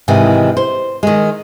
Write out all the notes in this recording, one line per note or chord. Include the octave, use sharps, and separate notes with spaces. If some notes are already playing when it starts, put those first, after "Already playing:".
G#2 C3 D#3 E3
C5
D#3 G#3